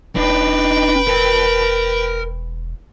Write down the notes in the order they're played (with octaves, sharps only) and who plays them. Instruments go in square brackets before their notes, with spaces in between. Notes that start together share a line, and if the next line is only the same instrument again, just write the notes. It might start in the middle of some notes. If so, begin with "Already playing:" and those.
[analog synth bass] E1 [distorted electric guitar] D4 D#4 [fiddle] B4 G5
[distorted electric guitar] A#4 A5